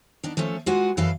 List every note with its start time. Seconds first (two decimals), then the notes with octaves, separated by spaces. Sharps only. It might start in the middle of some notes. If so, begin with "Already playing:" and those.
0.23 B3 D4 D#4
0.37 F3 A3 C#4 A4
0.66 G#3 F4 F#4 B4 F#5 G#5
0.97 F#2 E3 A4 B4 F5